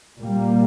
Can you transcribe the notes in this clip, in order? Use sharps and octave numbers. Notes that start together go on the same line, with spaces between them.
A#2 G3 A#3